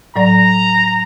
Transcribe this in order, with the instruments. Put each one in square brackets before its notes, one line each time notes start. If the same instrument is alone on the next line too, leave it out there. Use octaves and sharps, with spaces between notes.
[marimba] A2 F#3 D5 [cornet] A#5